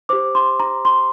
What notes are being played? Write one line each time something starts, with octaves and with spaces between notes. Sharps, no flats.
G4 C5 D6
C6
A#5
C6